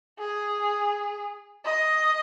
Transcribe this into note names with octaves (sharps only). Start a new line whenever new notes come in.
G#4
D#5